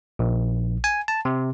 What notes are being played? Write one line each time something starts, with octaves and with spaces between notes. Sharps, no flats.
A#1
G#5
A5
C3